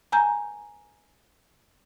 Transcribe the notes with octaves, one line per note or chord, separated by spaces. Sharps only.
G#5 A#5 G6